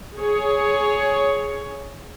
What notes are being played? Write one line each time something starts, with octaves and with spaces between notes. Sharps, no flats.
G#4 C#5